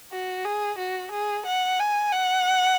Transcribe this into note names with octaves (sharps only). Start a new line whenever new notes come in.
F#4
G#4
F#4
G#4
F#5
G#5
F#5